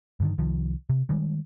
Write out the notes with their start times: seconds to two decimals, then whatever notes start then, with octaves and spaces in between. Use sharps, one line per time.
0.20 G2 D3 D#3
0.38 C2 D#3 F3
0.89 C3
1.09 D#3 G3 G#3